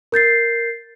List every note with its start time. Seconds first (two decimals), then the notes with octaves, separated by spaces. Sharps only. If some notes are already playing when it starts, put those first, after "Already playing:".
0.12 A#4 G6 A6 C7